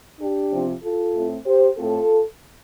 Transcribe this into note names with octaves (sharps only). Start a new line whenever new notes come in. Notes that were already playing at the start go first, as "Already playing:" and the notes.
D4 G4
C3 F3 C4
F4 A4
A2 A3 C4
G4 C5
A2 A3 C4 F4 A4